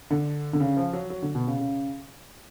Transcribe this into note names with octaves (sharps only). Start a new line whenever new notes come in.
D3
D3
C#3
F3
F#3
F#3
D3
B2
C#3
C#3